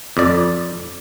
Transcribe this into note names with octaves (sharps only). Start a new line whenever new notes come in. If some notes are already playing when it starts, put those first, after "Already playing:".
F2 D5